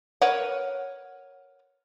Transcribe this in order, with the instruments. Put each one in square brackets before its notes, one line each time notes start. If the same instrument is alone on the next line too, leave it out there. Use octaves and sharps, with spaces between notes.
[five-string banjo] A#4 B4 C#5 F#5